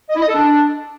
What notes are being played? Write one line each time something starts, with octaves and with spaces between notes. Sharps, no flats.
D#5
E4
D#5
A4
D4